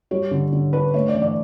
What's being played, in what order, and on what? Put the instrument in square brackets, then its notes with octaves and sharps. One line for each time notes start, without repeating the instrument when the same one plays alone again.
[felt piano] G3 C#5
D3
D3
D4 B4
A3 C#5
D5
E3
D5